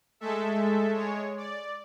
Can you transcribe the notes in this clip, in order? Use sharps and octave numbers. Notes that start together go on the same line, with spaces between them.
G#3 A3 A4 E5
G#3 C#5
D5